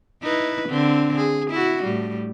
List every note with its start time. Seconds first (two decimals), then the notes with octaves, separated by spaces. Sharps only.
0.23 D#4 E4 B4
0.69 D3 C4
1.16 G#4
1.51 E4 F#4
1.84 A2 G3